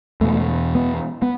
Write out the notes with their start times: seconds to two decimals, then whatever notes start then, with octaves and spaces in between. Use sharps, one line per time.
0.21 E2 B2 A3
0.75 B3
1.22 B3